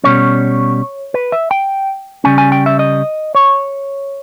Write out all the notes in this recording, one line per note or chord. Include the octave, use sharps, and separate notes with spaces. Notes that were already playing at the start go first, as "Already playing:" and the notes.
B2 G3 C#4 C#5
B4
E5
G5
C#3 G3 C#4 G#5
G#5
G5
E5
D#5
C#5